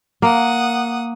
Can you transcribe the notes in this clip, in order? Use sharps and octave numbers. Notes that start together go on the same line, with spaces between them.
A#3 F#5 D#6